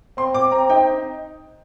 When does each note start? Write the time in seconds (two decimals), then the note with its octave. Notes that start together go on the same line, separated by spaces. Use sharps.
0.17 C4 C6
0.34 C4 D6
0.52 C4 A#5
0.70 D#4 G5